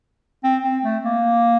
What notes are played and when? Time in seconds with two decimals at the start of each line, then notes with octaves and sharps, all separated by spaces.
0.44 C4
0.64 C4
0.83 A3
1.04 A#3